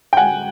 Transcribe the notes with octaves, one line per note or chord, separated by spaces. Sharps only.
G5
F#5 G#5